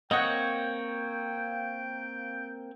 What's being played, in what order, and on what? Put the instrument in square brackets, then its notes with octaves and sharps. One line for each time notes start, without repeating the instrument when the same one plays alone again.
[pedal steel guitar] A#3 C4 C#5 [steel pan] D#5 F#5 [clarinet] G5